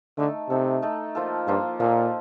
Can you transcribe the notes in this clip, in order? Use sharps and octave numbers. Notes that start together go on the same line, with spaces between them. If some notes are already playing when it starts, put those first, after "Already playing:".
D3 A3 D#4 A4
C3 A3 D#4 A4
A3 D#4 A4
F3 A#3 F4 A4
G2 F3 A#3 F4 A4
A#2 F3 A#3 F4 A4